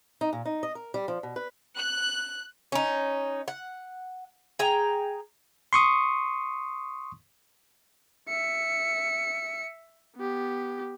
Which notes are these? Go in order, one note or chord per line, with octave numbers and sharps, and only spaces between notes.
D#4
A#2
D#4
D#5
A#4
G3
F3
B2
B4
F#6
C#4 D#4
F#5
G#4 G5 A#5
C6 C#6 D#6
E5 C#7
B3 G4